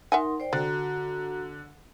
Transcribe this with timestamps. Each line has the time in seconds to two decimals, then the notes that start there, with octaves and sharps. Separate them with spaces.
0.12 D#4 A#4 E5 F#5 G#5 C6
0.40 C5 D5 G5
0.53 D3 F#4 D5 A#5